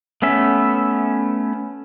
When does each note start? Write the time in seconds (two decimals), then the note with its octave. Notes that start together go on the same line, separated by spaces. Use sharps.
0.22 A3 B3 C#4 E5